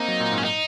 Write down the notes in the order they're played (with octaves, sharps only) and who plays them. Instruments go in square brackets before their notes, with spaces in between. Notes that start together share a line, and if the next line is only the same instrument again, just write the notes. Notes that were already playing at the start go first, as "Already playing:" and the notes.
Already playing: [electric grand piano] A#3 C4 [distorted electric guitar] D#4
[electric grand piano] F#3
A#2
G#2
[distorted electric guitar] C#4
D#4